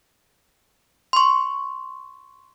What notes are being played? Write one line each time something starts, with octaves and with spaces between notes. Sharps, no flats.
C6 C#6